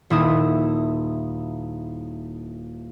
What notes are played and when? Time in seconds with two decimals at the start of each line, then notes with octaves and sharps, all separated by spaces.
0.10 D#1 E4 D#6